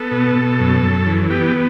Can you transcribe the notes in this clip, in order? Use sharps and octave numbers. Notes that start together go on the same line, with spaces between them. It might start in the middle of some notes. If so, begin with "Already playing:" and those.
Already playing: B3 A4
B2
B2
F#2
F#2
E3
B3 G4